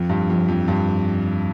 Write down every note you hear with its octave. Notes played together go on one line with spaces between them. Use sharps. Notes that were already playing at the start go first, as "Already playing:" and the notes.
Already playing: F2
G2
F2
F2
G2